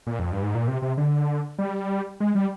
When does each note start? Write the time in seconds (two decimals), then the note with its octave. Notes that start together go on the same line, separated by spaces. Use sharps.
0.07 A#2
0.19 F2
0.32 G2
0.43 G#2
0.55 A#2
0.68 C3
0.82 C3
0.97 D3
1.58 G3
2.20 G#3
2.35 G3